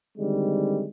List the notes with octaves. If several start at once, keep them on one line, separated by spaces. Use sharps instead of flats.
D3 D#3 G3 G#3 C4